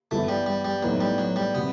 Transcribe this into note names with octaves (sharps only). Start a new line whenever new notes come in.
G2 E3 A3 B3 E4
G3
G3
G3
A2 E3 F#3 B3 D#4
G3
F#3
G3
C3 F#3 B3